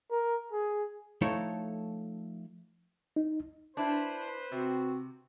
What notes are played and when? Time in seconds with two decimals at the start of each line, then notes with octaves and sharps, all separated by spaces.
0.11 A#4
0.52 G#4
1.21 F3 A3 D#4 E4 A4 C#5
3.16 D#4
3.77 D4 E4 B4 C5
4.52 C3 C4 F#4